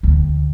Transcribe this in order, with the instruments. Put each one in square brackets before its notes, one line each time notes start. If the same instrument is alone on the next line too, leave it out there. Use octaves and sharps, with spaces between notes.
[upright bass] D2